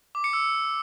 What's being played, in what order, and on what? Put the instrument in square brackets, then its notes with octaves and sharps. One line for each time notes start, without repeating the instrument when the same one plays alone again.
[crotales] D6
C#7
E6